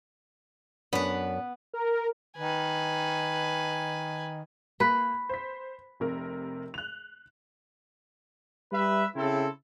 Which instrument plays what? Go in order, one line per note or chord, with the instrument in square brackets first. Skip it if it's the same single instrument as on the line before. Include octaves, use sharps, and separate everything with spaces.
[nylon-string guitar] F#2 D4 [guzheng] B3 B4
[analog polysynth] A#4
[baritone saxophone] D#3 [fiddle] B4 G#5
[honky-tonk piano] A#3 [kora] B4
[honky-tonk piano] C5 B6
F1 C3 A#4
F#6 F7
[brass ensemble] G3 B4 E5
C#3 C4 E4 A4